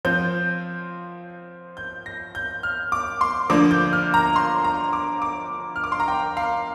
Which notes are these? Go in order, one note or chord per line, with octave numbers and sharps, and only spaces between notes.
F3 C4 G6
G6
A#6
G6
F6
D6
C6
D3 F3 A#3 D4 D6
G6
F6
A#5
C6
A#5
D6
D6
F6
D6
C6
A#5
G5
F5